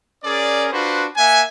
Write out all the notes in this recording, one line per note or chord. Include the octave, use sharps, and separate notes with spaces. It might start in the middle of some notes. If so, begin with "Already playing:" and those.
C#4 G#4 A#4 D5
D4 F4 F#4 B4 C5
A#3 E5 F#5 G#5